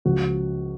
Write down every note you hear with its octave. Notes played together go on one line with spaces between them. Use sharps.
C#2 C#3 F3 F#4